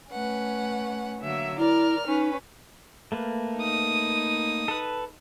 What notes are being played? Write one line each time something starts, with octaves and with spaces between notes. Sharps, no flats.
A3 C#4 B4 F#5
D3 F#3 A#3 E5
E4 A#4 D5 F6
C#4 D#4 B4
A3 A#3 B4
D#4 D#6
A4 B4